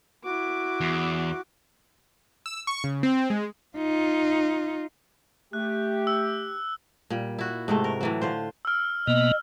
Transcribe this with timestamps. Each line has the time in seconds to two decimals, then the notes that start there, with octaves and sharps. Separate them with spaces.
0.25 E4 F#4 D6
0.80 E2
2.46 E6
2.67 C#6
2.84 C#3
3.03 C4
3.30 G#3
3.77 D#4 F4
5.53 A3 G4 F#6
6.07 E6
7.10 A#2 G3
7.39 E4 F#4
7.68 G#2 C3 A3
7.84 A#4
8.01 A2 E3 F#3
8.21 D3 F4 C5
8.65 E6 F6
9.07 B2 A#3 B3 D#5